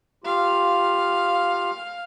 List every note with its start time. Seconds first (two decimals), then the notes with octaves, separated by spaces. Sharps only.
0.24 F4 G4 F5